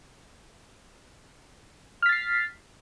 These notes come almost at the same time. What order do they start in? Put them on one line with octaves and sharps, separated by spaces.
F6 B6 A6 C7